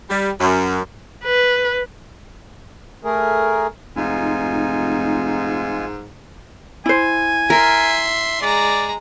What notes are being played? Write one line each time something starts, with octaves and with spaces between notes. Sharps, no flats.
G3
F#2
B4
A3 G#4 A#4
F1 G#2 D#4 F4 G#5
E4 C5 G#5
A#4 E5 C6
G#3 D5 A#5